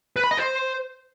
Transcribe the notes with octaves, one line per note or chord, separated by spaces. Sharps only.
B4
B5
D#5
C5